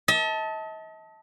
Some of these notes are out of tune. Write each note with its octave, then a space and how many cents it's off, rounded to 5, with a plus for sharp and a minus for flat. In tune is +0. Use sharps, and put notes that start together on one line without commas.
D#5 +45 A5 +0